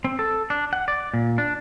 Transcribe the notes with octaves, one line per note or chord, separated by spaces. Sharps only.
C4
A4
D4
F#5
D5
A#2
D4